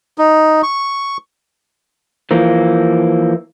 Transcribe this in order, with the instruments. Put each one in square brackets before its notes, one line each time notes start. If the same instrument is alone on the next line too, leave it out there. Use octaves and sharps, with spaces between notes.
[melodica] D#4
C#6
[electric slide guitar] E3 F3 A#3